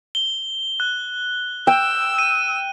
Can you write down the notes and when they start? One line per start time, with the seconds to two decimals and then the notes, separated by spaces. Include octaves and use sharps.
0.15 G7
0.80 F#6
1.67 G5 E6
2.18 D#7